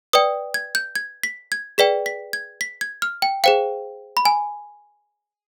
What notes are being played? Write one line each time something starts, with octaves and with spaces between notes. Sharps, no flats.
B4 D5 G5 D#6
G#6
G6
G#6
B6
G#6
G#4 B4 D5 G5 B6
B6
G#6
B6
G#6
F6
G5
G#4 C5 F5 G5
B5
G#5